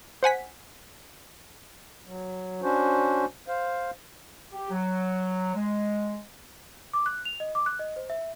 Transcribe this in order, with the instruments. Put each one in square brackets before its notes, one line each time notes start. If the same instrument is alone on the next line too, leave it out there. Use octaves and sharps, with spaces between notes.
[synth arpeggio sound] C5 F#5 G#5 B6
[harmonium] F#3
C#4 D4 F#4 C5
C5 F5
[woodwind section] G4
F#3
G#3
[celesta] D6
F#6
F7
D#5
D6
F#6
D#5
C5
E5